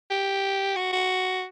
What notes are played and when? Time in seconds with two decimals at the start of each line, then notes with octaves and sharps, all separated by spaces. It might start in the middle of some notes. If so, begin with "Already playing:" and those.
0.10 G4
0.76 F#4
0.92 F#4